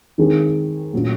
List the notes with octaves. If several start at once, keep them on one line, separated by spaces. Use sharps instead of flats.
D#3 G#3 C4 D#4 G#4
A#2 F#3 A3 C#4